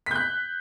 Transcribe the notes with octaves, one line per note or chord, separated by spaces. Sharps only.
F#6 G6 B6